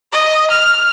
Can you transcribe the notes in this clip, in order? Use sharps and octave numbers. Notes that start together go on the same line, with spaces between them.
D#5
F6